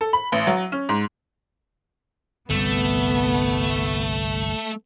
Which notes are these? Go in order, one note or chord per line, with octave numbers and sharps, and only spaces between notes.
A4
B5
A1
F#3
C#4
G#2
G1 C2 A3 B3